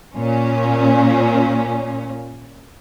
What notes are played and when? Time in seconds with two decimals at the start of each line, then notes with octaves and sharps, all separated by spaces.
0.16 A#2 C#4